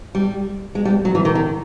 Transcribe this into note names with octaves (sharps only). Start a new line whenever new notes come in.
G3
G#3
G3
F#3
E3
D#3
D#3